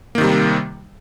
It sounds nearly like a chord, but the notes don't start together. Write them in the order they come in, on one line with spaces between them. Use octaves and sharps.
A#3 D#3 C3 G3